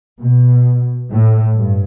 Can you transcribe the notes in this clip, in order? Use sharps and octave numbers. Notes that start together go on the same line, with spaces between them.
B2
A2
G2